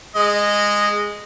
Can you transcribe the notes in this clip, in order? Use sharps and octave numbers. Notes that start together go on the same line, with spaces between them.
G#3 D#5